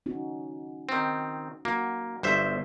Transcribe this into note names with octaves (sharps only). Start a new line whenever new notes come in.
C#4 D#4 F#4
D#3 C4
A#3 F#4
G1 G3 B3 C5 E5